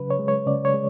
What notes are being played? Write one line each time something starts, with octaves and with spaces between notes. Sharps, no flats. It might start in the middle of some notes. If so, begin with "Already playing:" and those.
Already playing: C#3 F#3 B4
C#5
G#3
C#5
C#3 D5
C#5
G#3